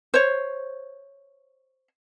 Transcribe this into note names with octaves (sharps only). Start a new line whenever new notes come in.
C5 C#5